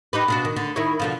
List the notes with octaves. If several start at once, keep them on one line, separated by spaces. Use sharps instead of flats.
D#4 G4 B4
B2 D4 F#4
D#3
D3
D#3 E4 C#5
B2 D3 F3